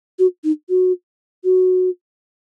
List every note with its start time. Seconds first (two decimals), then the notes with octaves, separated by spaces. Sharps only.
0.19 F#4
0.44 D#4
0.69 F#4
1.44 F#4